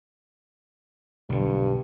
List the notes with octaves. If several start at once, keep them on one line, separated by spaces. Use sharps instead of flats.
B1 G2 D3